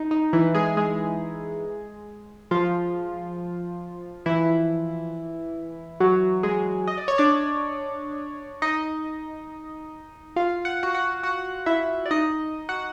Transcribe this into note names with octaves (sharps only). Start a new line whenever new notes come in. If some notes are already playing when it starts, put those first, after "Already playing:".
Already playing: D#4
D#4
E3 E4
G#3 G#4
G#3 G#4
F3 F4
E3 E4
F#3 F#4
G#3 G#4
D#5
D5
C#5
D4 D5
D#4 D#5
F4 F5
F#5
F#4 F#5
F#4 F#5
F#4 F#5
E4 E5
D5
D#4 D#5
F#4 F#5